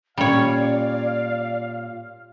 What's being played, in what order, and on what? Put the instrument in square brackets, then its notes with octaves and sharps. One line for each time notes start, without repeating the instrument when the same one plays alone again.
[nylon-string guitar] A#2 C#4 [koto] G3 C#5 [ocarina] D5 [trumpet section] F5